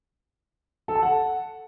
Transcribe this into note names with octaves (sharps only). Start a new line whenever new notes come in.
A4
A5
F#5